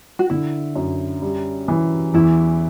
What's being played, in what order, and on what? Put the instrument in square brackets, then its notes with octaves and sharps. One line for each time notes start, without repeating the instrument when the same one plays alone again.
[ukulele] F#4
[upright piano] D3 [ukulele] E4
[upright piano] F#2
G3
E3
[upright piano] E2 [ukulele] E4